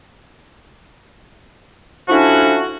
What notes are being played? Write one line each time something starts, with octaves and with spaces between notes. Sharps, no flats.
F3 A3 C#4 D4 E4 F#4